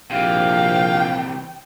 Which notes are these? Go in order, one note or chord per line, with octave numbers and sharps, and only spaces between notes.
A#1 C3 E3 F5 G5